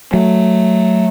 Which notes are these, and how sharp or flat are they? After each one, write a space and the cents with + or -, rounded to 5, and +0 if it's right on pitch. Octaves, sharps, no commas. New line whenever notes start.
F#3 +0 A3 +0